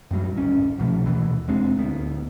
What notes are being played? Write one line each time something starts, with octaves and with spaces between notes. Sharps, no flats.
F#2 A2 F#3 G3
D1 G#1 C#4
C2 B2 F3 A3
D#1 D#2 B2 E3
E1 G#3 C4 D4
D1 D2 B3